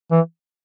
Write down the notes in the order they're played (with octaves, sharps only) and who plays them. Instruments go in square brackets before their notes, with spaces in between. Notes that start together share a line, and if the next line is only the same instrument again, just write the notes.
[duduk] E3